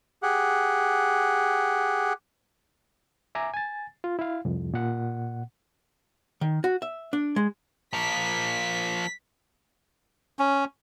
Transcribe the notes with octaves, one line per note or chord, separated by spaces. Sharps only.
G4 G#4 F#5
E5 G#5 A#5 D6
G#5 A6
F4
E4 F5
C2 F2
A#2 F#5
D#3
F#4
E5
D4
G#3
F3 A#3 B6
C#4